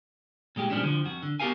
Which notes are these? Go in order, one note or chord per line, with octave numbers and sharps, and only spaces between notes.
A#2 G#3 G4
A#2 F3 G3 G#3 C#4 D4
D3 F3
F2 F#4
D3
B3 F#4 G4 A#4 F5 G#5